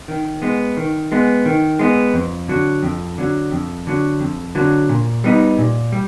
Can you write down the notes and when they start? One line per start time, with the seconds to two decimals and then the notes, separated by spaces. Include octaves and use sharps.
0.08 D#3
0.42 G#3 B3
0.77 D#3
1.12 G#3 B3
1.46 D#3
1.79 G#3 B3
2.14 F2
2.48 D3 F#3
2.83 F2
3.18 D3 F#3
3.51 F2
3.87 D3 F#3
4.21 F2
4.55 D3 F#3
4.89 A#2
5.24 G3 B3 D#4
5.58 A#2
5.92 G3